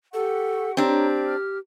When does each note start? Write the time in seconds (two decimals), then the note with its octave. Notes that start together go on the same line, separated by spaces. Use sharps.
0.14 G4 A4 F#5 C#6
0.77 C4 D4 G4 C#5 A#5
1.25 F6